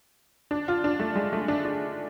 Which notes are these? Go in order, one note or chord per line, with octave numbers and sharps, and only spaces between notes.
D4
F4
D4
A3
G#3
A3
D4
D4